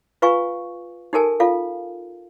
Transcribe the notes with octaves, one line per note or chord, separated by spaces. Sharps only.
F4 B4 F5 G#5 C#6
D#4 G4 A4 A#4 G#5 A5
F4 A4 F5